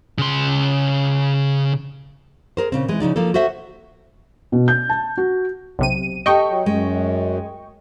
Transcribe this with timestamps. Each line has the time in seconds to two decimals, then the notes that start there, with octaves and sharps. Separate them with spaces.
0.18 C#3 C6
2.57 G#4 A#4 C5
2.72 A#2 C#3 C4
2.88 E3 G#3
3.00 C#3 F3 D#4 D5
3.16 F3 A#3 A4
3.34 F#4 A4 C5 E5 F#5
4.52 B2
4.68 G6
4.89 A5
5.17 F#4
5.79 B1 C3 D#7
6.26 G4 A4 D#5 G5 C#6
6.49 F#3
6.66 F#2 G#3